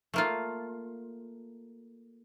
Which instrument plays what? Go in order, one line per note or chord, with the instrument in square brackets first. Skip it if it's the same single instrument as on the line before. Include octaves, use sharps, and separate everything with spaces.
[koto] A3 A#3 F4